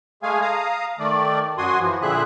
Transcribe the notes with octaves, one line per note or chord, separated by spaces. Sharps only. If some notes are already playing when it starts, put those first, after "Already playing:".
G#3 A3 G#4 F5 G#5
F5 A#5 D#6
D#3 A3 D5
F#2 F#4 G#5 C6 D#6
E3 F3
A#2 D3 C4 G#4 E5 F#6